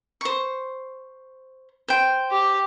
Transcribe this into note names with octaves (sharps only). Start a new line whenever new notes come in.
C5 C#6
C5 G5
G4